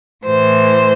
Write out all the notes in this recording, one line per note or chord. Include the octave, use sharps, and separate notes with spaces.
A2 E3 C5